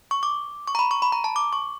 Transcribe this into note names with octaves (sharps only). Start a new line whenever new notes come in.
C#6
D6
C#6
A#5
B5
C#6
B5
A#5
A5
D6
C#6